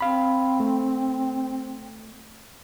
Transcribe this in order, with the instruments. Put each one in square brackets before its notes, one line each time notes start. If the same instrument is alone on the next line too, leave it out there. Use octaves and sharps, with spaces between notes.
[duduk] C4 [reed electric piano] F5 B5
[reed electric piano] A3